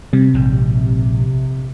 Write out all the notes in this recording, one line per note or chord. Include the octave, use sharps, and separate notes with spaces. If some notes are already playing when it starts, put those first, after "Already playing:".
C3 G3
A#1 G#2